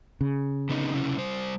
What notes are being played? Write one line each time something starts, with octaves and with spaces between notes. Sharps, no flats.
C#3
D3 B3 D#4
C3 C#4 E4
G3 C5